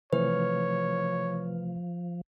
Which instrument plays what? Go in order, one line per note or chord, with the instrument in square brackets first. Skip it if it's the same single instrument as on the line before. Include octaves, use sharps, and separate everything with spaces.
[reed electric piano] C3 E3 A3 [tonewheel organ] F3 [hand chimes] B4 [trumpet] C#5